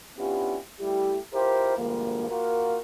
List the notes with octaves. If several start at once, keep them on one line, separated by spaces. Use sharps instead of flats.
B3 C#4 D4 E4 F4 G4
G3 A3 E4 G4
E4 F4 G4 A#4 C5
D2 G2 F3 G#3 A#3
A#3 F4 F#4 A#4